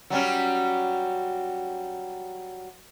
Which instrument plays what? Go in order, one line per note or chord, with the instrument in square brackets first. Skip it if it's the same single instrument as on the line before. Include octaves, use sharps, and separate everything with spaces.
[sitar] F#3 G3 C#4